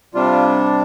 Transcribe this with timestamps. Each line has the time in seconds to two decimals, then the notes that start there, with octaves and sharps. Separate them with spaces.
0.15 C3 G3 D4 F4